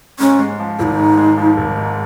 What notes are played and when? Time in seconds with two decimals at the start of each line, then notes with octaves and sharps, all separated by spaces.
0.19 G#2 C#4
0.39 G#3
0.59 F3
0.79 G#1 D#4 F4
0.99 G#2
1.18 G#3
1.38 F3
1.57 G#1
1.77 G#2